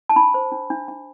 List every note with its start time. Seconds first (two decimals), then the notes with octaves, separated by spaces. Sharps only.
0.09 A5
0.16 D4 B5
0.34 C5
0.52 D4
0.70 D4
0.88 D4